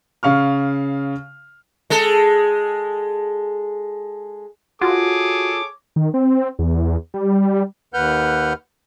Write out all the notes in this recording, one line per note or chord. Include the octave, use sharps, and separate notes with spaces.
C#3 F5 C#6 F6
G#3 A4
F4 F#4 G#4 A4 C#5 D6
D#3
C4
E2
G3
D#2 B4 F#5 F6 G6